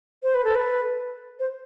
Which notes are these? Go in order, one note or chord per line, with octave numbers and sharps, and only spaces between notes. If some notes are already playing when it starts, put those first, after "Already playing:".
C5
B4
A4
B4
C5